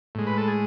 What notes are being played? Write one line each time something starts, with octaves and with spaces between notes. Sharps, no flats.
A2 G#3
B4
A4
G#4